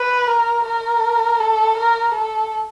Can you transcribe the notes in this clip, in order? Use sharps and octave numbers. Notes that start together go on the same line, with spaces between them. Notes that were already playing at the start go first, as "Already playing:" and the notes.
Already playing: B4
A#4
A#4
A4
A#4
A4